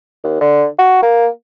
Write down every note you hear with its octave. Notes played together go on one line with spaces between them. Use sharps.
D#2
D3
F#4
A#3